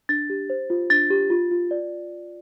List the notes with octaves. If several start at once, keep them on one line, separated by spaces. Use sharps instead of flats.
D4 A6
G4
C5
F4
D4 A6
G4
F4
F4
D5